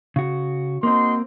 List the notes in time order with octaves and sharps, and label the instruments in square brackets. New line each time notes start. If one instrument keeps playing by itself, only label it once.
[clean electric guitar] C#3 F#4
[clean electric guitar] A#3 C4 [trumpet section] D#4 F#4 C6